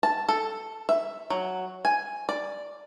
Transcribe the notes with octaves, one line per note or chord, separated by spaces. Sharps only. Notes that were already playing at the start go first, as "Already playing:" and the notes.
A5
A4
E5
F#3
G#5
D5